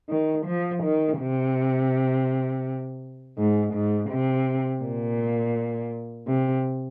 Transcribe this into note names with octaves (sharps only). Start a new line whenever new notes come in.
D#3
F3
D#3
C3
G#2
G#2
C3
A#2
C3